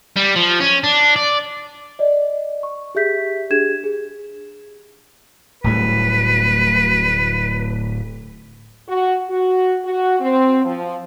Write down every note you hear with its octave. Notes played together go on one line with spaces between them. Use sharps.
G3
F3
C#4
D4
D5
D5 D#5
C#6
G4 G#4 E5 G6 B6
D4 G4 G#4 G#6 E7
G#4
D1 A2 G3 B4
F#4
F#4
F#4
C4
F3